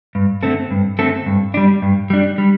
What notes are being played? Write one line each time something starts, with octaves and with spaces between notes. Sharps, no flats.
G2
D3 A3 C4 A4
G2
D3 A3 C4 A4
G2
G3 D4
G2
G3 D4
G3